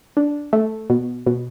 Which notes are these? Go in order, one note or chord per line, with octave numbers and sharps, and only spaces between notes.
D4
A3
B2
B2